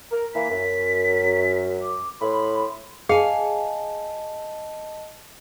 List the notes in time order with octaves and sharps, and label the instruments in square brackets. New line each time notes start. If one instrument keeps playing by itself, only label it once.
[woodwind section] A#4
[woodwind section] E3 A#3 [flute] B6
[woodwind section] F#2
[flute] D6
[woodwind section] A2 B5 [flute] C6
[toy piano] G#4 [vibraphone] D#5 A5 [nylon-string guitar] F5 G#5